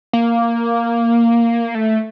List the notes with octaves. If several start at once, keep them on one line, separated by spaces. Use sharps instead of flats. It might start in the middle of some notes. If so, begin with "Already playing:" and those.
A#3
A3